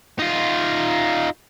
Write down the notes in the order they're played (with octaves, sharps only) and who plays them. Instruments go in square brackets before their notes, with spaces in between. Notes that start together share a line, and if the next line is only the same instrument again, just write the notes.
[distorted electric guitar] D#4 F4